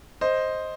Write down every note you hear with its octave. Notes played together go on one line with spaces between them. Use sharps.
C5 D#5